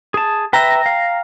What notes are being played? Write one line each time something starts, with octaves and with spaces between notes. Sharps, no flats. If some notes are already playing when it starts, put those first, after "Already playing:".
G#4 A5
B4 E5 G5 A#5 A#6
F5